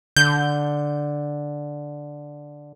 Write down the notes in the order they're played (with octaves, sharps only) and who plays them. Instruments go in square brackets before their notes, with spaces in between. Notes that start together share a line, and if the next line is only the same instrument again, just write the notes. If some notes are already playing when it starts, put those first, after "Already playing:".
[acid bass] D3 [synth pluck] G6